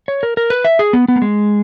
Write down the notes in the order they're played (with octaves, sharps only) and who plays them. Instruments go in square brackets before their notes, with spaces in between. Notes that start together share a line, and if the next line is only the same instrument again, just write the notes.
[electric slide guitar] C#5
A#4
A#4
B4
E5
G#4
B3
B3
A#3
G#3